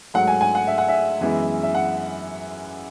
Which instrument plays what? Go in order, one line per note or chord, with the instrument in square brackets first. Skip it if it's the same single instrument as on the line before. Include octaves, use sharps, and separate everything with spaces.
[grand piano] G#2 F#3 A3 F#5
G#5
G#5
F#5
E5
F#5
E5
F#2 E3 G#3 B3
E5
F#5